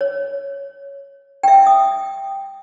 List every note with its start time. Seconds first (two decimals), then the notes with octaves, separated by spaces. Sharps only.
0.01 C#5
1.43 E5 G5
1.67 D#6